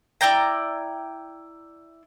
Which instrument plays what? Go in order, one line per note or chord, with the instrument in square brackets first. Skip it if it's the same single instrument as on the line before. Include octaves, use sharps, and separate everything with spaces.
[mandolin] E4 D5 G5 A#5